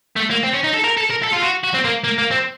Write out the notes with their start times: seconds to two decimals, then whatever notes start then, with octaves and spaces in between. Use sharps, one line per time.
0.16 A3
0.30 A#3
0.43 C4
0.54 C#4
0.64 D#4
0.73 A4
0.84 A#4
0.97 A4
1.10 A#4
1.23 A4
1.33 F4
1.43 F#4
1.64 F#4
1.74 C4
1.85 A#3
2.04 A#3
2.18 A#3
2.31 C4